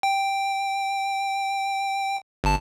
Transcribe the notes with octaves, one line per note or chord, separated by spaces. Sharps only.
G5
G1 A5